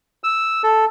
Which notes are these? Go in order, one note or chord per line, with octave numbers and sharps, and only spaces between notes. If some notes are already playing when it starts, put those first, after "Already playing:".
E6
A4